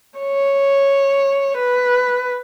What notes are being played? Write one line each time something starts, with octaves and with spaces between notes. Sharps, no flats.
C#5
B4